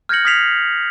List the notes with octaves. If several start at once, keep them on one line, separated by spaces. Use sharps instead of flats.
F6 G6 G#6 A#6 C#7 F#7
D#6 F6 G#6 B6 C7 F7